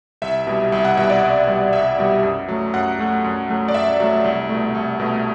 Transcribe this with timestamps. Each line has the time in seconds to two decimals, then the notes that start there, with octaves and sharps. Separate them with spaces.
0.22 C2 E5
0.47 B2 G3
0.72 C2 E5
0.85 F#5
0.97 B2 G3 E5
1.10 D5
1.23 C2
1.47 B2 G3
1.72 C2 E5
1.98 B2 G3
2.23 F#2
2.48 F#3 A3
2.74 F#2 F#5
2.99 F#3 A3
3.24 F#2
3.49 F#3 A3
3.68 D5
3.74 F#2 E5
4.00 F#3 A3
4.24 C2
4.49 A3
4.54 B2
4.75 C2
5.00 B2 A3